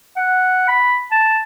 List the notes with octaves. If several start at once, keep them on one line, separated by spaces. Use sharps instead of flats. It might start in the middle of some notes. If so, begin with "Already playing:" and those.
F#5
B5
A5